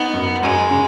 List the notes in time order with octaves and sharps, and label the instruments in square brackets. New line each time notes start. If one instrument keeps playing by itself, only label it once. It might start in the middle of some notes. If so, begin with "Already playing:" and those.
Already playing: [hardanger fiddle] B3 [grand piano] D#4
[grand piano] F#2
[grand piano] F#2 [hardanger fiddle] G#3
[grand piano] C#3